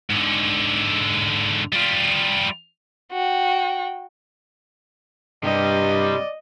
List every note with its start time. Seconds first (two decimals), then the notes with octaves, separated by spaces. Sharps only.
0.10 G#2 D3
1.73 G3 F4
3.12 F#4 G5
5.44 G2 C3 G3 D5 D#5